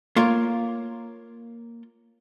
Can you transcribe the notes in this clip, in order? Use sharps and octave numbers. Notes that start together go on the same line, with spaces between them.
A#3 F4 A#4 C#5